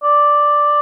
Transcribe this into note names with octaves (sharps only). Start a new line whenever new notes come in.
D5